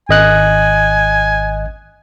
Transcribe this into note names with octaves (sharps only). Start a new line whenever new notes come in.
G#1 D#5 G#5 F#6